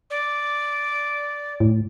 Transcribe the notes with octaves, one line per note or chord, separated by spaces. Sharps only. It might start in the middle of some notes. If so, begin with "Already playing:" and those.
D5
A2